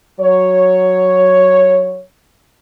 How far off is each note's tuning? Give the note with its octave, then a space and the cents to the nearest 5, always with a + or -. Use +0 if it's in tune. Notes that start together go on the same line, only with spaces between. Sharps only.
F#3 +0 C#5 +0